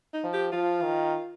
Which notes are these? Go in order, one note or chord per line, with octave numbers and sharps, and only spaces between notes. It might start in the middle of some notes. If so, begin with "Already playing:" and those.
D#4
F3
G4
F3 F4
D#3